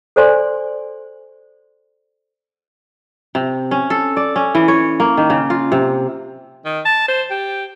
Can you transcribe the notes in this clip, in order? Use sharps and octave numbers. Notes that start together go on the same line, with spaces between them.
A4 C5 D5 G#5 C6
C3
C#4
A4
D5
C#4
E3
C#5
A#3
D#3
C#3
F4
C3
D#3
A5
C5
G4